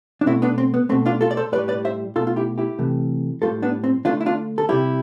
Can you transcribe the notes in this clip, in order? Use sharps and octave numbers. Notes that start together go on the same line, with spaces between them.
D4
B2 A3 C4 E4
B3 D4
C4
B3
B2 A3 C4
D4 F4
F4 A4
D5
A4 C5
A2 G3 B4 D5
B4 D5
C5 E5
B2 A3 F4 A4
F4
E4 G4
E4 G4
C3 E3 A3
A2 G3 F4 A4
B3 D4
C4
D3 A3 D4 F4
E4
D4 F4
A4
C3 G3 E4 G4